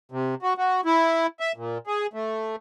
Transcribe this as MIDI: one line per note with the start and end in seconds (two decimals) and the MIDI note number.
0.12 0.35 48
0.42 0.54 66
0.58 0.81 66
0.85 1.27 64
1.40 1.52 76
1.56 1.78 46
1.87 2.07 68
2.13 2.56 57